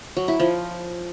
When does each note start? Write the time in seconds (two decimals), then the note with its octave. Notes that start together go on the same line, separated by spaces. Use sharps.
0.17 F#3
0.28 E4
0.40 F3